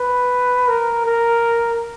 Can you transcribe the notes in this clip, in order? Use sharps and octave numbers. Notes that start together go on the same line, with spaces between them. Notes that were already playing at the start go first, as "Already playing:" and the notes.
Already playing: B4
A#4
A#4